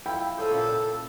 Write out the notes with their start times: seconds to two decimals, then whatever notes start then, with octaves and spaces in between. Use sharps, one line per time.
0.06 E4 F4 G5
0.37 C#4 G#4 A4 C5
0.51 A#2 C#3